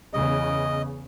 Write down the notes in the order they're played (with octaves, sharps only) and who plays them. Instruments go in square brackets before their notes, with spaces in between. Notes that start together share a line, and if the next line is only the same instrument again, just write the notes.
[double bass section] E2 C#3 [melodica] D#5